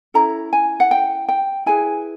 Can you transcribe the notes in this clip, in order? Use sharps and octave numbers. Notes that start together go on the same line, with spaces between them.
C#4 E4 A4 A#5
G#5
F#5
G5
G5
E4 G#4 B4 G#5